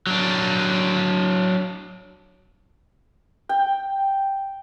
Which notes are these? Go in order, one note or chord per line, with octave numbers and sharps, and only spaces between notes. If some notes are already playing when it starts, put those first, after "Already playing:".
F#3 D4
G5